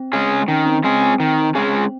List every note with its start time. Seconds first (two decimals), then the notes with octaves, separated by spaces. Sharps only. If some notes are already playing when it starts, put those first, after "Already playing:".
Already playing: C4
0.13 G#3 C#4 G#4
0.48 D#3 C#4
0.66 C4
0.84 G#3 C4 C#4 G#4
1.01 C4
1.20 D#3
1.55 G#3 C#4 G#4